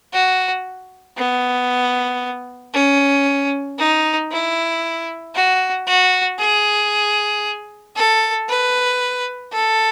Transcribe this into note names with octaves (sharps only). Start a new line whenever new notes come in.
F#4
B3
C#4
D#4
E4
F#4
F#4
G#4
A4
B4
A4